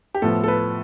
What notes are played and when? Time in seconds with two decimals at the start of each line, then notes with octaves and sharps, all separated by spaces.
0.15 G4
0.22 A2 F3 B3 A4
0.44 A4
0.48 B4